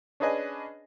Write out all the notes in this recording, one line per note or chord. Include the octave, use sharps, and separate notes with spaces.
C#4 D4 G#4 B4 D#5 G#5